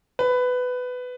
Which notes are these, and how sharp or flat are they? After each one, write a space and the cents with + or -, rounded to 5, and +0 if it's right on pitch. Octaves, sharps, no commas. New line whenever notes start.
B4 +15